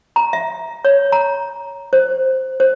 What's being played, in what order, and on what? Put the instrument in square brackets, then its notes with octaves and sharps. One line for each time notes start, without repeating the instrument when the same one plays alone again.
[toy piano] A#5
E5
C#5
A#5
C5
C5